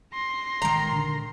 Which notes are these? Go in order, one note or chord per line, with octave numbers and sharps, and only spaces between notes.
C6 A#6
A1 D#3 G#3 A#5
A#2 D3 D4